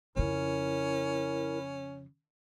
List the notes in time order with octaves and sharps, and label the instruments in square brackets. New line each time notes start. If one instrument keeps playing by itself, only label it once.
[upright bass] F2 C#3 [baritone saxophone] C#4 [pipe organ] E4 A#4